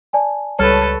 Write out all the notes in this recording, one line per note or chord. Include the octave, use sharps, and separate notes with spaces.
D5 G#5 A5
C#2 G3 A4 B4 C#5 A5 F6